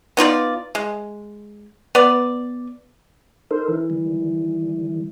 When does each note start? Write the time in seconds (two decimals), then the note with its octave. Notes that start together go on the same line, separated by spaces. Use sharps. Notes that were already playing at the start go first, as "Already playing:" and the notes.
0.17 B3 D#4 F4 D5
0.75 G#3
1.95 B3 D5
3.51 D#4 A4 A#4 C5
3.68 E3
3.90 D#3 G3